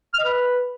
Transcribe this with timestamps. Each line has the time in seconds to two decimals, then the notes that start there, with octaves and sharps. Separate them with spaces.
0.14 F6
0.19 D#5
0.24 B4